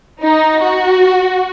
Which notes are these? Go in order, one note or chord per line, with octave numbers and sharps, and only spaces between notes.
D#4
F#4